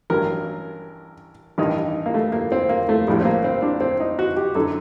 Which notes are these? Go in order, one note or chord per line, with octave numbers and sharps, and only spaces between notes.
A1 G2 F#3 A#4
A1 G2 D#3 D#4
A#3
A3
A#3
C4
A#3
A3
A#1 A2 G3
C4
A#3
C4
D4
C4
D#4
F#4
G4
F#2 D3 F#3 A4